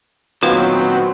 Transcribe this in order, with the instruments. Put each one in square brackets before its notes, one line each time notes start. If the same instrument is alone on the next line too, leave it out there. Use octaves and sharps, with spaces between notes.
[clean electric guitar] A#2 D#3 [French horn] F#3 [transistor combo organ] B3 C4 [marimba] F4 B4 F5